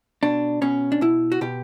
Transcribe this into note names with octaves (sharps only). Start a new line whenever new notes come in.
B2 D4
B2 C#4
D4
B2 E4
F#4
B2 G4